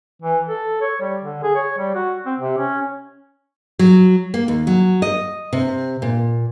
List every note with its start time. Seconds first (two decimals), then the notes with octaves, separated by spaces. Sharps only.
0.22 E3
0.49 A4
0.81 C#5
1.01 G3
1.22 D3
1.43 G#4
1.56 C#5
1.78 G3
1.95 F#4
2.26 C4
2.39 C3
2.58 C#4
3.79 F#3
4.34 A#3
4.48 D#2
4.67 F#3
5.02 D#5
5.53 C3
6.02 A#2